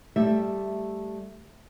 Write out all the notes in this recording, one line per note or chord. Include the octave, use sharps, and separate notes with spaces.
G3 A3 E5